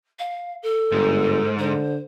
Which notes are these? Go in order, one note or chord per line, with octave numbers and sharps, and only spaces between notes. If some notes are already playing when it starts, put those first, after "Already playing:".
F5
A4
G1 G#2
D3 C5